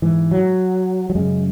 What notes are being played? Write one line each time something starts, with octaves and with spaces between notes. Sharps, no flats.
G#2 E3
F#3
F#3
F#2 C#3 G#3